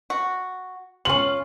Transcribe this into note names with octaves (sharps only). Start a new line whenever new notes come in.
F#4
C#4 F4 F#7